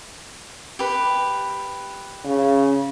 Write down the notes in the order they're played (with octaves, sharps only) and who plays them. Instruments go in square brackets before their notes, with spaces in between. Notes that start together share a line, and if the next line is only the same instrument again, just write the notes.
[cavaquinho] G4 B4
[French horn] C#3